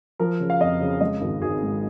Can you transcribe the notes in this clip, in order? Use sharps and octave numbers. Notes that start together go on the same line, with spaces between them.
F3 A#4
C#3
F5
F2 D#5
C#3
G#3 D#5
G#1
G#1 G#4
G#2